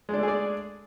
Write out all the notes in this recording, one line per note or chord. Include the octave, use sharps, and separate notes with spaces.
G#3 A3 D4 G#4 D5